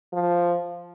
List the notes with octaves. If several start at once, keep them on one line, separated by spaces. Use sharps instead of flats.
F3